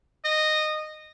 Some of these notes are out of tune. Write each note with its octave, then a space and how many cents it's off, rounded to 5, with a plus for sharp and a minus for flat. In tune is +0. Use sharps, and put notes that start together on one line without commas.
D#5 -15